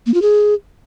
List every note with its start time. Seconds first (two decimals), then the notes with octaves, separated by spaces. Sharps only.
0.06 A#3
0.14 F4
0.22 G#4